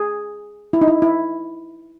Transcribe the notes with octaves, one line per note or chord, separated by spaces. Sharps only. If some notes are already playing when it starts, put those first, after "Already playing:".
Already playing: G#4
E4
D#4
E4
E4